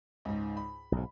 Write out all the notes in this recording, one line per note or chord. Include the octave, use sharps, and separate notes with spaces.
C#2 G#2
B5
B1 G#2